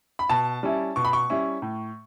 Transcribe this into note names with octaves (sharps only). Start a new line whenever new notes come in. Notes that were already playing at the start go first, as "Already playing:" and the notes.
B5
B2 A5
G3 C#4 E4
B2 C#6
B5
C#6
G3 C#4 E4
A2